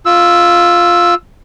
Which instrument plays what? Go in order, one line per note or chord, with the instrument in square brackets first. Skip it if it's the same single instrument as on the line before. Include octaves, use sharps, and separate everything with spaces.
[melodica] F4 E6